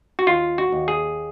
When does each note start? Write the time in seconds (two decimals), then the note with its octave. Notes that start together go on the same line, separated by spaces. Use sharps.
0.19 F#4
0.27 D#2 F4
0.58 F#4
0.72 D#2
0.88 G#4